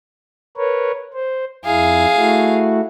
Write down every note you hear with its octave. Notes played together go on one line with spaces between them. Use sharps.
A#4 B4 C#5
C5
F2 E4 G#4 F5
A3 E4 F#4